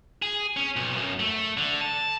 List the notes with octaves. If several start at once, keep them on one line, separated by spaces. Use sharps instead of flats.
G#4
C#4
B1
F#2
A3
D3
A5